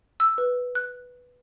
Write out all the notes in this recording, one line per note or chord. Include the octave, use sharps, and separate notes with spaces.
E6
B4
F#6